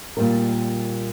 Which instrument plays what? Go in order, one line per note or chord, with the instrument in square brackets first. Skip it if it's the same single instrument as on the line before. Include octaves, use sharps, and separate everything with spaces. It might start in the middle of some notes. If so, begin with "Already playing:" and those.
[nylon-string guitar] A#2 G3 A#4